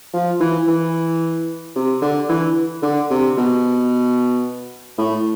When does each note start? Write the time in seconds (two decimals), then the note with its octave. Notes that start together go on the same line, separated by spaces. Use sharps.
0.13 F3
0.40 E3
0.68 E3
1.76 C3
2.02 D3
2.29 E3
2.82 D3
3.11 C3
3.37 B2
4.98 A2